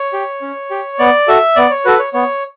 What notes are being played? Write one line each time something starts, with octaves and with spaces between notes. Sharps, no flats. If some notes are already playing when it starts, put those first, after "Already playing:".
Already playing: C#5
G4
C#4
G4
B3 D5
F#4 A4 E5
B3 D5
C#5
F#4 A4 B4
C#5
B3 C#5